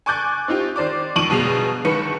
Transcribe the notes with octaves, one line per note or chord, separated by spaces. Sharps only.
G#5 C#6 D6 F#6 G6 A6
C4 D#4 F4 G4
D#3 C5 D5 D6
F2 D#3 C#6 D7 D#7 F#7
G1 B2 G#4 C7 F7
G1 D#3 B4 C#6 C#7